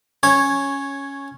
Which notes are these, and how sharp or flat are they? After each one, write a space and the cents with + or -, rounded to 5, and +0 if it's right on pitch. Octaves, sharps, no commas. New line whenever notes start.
C#4 +0 C#5 -10